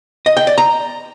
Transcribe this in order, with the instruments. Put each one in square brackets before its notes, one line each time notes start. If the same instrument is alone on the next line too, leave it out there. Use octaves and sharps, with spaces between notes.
[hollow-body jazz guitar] D#5
G5
D5
A#5